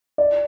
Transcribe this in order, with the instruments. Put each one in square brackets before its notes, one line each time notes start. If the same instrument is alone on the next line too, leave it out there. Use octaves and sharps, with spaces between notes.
[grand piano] D5